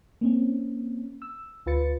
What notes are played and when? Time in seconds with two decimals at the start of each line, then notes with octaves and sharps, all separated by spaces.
0.21 A#3 C4 C#4
1.22 E6
1.66 D2 F4 B4 A6 C#7